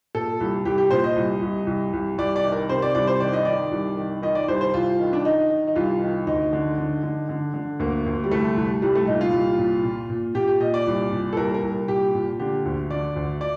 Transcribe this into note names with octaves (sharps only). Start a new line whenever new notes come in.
A#2 A4
C2
C2 G4
G4
A#2 C5
D#5
C2
C2
C2
C2
C2 D5
D5
D#3
A#4
C3 C5
D5
C2 D5
C5
D#3 D5
D#5
D#3 D5
C2
D#3
D#3 D#5
D5
C2 C5
C5
C2 F4
D#3
D4
D#3 D#4
D#3
D#4
C2 F4
D#3
D2 D#4
D3
D3
D3
D3
D3
D2 A#3
D2
G3
C2 A3
C2
C2 G3
A3
A#2 D#4
F4
C2
A#2
A#2
A#2
A#2 G4
G4
A#2 D#5
D5
C2
A#2
A4
C2 A#4
A#4
C2
A#2 G4
A#2
D3 G4
D2
D3 D5
D2
D5